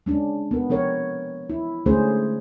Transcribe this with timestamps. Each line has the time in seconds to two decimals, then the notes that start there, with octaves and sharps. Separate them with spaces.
0.06 G#3 C#4 D4
0.51 B3 A#4
0.69 F3 C4 A#4 C#5
1.50 E4
1.86 D3 G#3 A3 C#4 G#4 C5